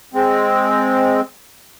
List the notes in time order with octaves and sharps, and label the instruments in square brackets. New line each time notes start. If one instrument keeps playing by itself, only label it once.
[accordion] G#3 C4